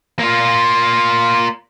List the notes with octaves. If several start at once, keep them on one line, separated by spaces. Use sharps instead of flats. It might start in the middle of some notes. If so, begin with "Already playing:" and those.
A#3 F4